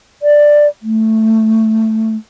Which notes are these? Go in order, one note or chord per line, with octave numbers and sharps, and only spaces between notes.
D5
A3